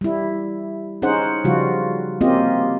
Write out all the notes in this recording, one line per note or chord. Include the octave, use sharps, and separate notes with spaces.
G3 E4
C#4 D#4 G#4 C5 F#5
C#3 F3 G3 F4 F#4
A#3 C4 C#4 F4 G4 D#5